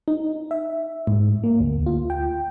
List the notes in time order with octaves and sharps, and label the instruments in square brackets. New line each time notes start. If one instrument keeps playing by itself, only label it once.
[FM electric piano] D#4
E5
G#2
A#3
D2
F4
G5